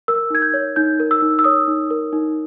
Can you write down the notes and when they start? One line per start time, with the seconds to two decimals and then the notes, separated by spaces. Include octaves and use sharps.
0.08 A#4 E6
0.30 D#4 G#6
0.42 G6
0.54 C#5
0.76 D#4 G6
1.00 A#4
1.11 E6
1.22 D#4
1.39 E6
1.44 C#5 D#6
1.68 D#4
1.90 A#4
2.13 D#4